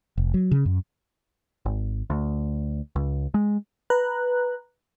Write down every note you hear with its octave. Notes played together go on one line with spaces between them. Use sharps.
F1
F#3
C#3
F#2
G#1
D2
C#2
G#3
B4 A#5 F#6